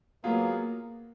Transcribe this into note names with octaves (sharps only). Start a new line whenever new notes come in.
F#3 A#3 B3 F4 G#4